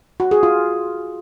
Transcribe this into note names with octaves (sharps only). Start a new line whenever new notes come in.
F#4
G#4
F4